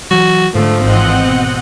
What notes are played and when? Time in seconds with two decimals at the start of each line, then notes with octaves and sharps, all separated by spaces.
0.11 E3 F#3 F#4
0.55 G#2 D3 F3 A3
0.83 G#1 E3 C4 C5 D#5 F#5
1.22 B2